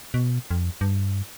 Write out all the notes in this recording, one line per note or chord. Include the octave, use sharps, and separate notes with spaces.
B2
F2
G2